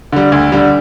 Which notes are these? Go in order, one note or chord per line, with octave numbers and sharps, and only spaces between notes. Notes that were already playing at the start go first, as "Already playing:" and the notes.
D3 G3
D2
D3 G3